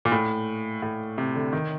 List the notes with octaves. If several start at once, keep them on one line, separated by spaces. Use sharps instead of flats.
A#2
A2
A2
C3
D3
D#3